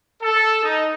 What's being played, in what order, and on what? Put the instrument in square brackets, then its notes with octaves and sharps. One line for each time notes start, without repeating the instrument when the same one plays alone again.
[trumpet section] A4
D#4